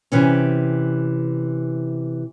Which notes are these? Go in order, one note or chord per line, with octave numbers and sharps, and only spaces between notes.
C3 E3 C#4